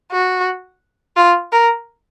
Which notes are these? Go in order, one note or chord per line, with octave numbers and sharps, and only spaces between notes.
F#4
F4
A#4